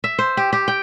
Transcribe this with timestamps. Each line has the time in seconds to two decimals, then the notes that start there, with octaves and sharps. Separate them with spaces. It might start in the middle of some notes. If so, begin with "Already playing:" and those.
0.04 E5
0.19 C5
0.37 G4
0.53 G4
0.68 G5